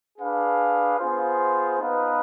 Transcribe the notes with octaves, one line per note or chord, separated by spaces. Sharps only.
D4 G#4 B4 F5
B3 F4 G#4 C5
B3 D#4 B4 F5